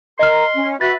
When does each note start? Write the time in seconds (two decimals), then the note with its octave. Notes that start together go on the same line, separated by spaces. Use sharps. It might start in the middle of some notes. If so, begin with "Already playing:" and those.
0.19 A#4 D#5 A#5 C6 F6
0.55 C#4
0.81 F#4 B4 E5 A6